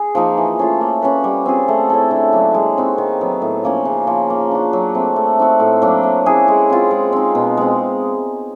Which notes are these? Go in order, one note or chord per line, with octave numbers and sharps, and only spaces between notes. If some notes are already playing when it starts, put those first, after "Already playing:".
Already playing: G#4
F3 A#3 D#4
E3
A3 C#4 F4
A#3
C#4 F#4 B4
G3
C4 F4 G#4
A3
C#4 E4 A4
D3
F#3 A#3 D4
G#3
C4 D#4 F#4
D#3
F#3 B3
A2
F3 A#3 C#4
C#3
F3 A#3
A#3
D4 F#4
F#3
A3 C4
A3
C4 D#4 F#4
A2
F#3 A#3 D4
A3
C#4 E4 G#4
G#3
C4 F4
G#3
C4 D#4
B2
G#3 C4